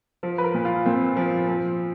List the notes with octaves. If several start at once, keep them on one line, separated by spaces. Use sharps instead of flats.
F3
B4
A#4
A#2
F4
A#2 C4
F3
F3